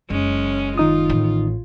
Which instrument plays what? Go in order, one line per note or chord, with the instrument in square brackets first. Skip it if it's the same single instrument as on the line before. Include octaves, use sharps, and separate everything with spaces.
[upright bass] F#1 [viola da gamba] G#3 C#4
[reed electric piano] D#3 D#4 D#6 [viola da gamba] F4
[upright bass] A1